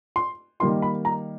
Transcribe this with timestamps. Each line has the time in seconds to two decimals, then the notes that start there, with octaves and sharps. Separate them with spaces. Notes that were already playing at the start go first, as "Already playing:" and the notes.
0.16 C6
0.60 D#3 G3 A#3 D#4 C6
0.82 B5
1.05 A#5